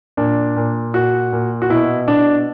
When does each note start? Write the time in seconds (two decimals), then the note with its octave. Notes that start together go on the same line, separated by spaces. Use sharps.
0.17 A#2 D4
0.56 A#2
0.94 A#2 F#4
1.32 A#2
1.62 F#4
1.70 B2 E4
2.08 B2 D4